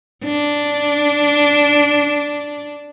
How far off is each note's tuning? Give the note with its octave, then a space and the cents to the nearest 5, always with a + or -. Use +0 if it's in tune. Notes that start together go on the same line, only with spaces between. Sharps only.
D4 -10